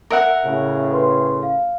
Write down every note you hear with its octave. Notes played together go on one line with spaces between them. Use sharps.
A#4 E5 F#5
A2 C#3
A4 B4 C6
F5